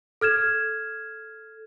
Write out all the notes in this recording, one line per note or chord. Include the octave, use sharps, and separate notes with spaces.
A4 F6 G#6 E7